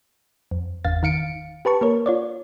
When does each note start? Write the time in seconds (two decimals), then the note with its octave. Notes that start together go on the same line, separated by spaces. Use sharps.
0.51 F2
0.84 G1 E2 F5 A6
1.03 D#3 F5 C#7 D7
1.65 G4 B4 A5 C#6
1.81 A#3 A#4 C#5
2.06 F4 C#5 D5